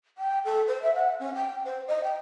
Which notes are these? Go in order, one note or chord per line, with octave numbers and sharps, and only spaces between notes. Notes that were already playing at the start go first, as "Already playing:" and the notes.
G5
A4
C5
E5
F#5
C#4
G5
C5
D#5
G5